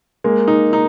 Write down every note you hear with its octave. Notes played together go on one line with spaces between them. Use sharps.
G#3 A#3
D#4
D#4